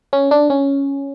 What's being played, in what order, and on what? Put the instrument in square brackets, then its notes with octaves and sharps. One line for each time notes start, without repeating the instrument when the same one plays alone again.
[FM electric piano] C#4
D4
C#4